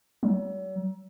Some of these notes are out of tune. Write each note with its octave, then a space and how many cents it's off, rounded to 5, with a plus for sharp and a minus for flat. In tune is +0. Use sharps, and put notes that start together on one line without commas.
F#3 +40